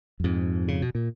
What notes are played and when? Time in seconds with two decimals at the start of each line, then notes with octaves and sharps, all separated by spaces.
0.20 F#2
0.24 F2 G#2
0.68 C#3
0.82 B2
0.95 A#2